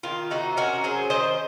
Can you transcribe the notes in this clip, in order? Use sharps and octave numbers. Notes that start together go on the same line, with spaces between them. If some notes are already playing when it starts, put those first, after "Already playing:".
D#3 F4
C3 D#4 F#4
C#4 F#4 A#4
F#3 G#4 C5
D#3 C5 D#5